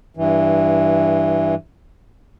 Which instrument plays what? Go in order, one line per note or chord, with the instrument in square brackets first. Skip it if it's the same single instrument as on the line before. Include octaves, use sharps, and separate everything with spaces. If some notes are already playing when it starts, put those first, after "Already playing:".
[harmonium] G2 E3